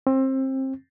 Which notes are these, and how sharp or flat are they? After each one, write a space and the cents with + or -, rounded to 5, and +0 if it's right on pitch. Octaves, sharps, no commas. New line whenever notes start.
C4 +25